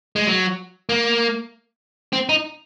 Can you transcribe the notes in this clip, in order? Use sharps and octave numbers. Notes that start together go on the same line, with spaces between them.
G#3
F#3
A#3
C4
D#4